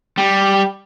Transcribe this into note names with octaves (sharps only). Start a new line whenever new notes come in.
G3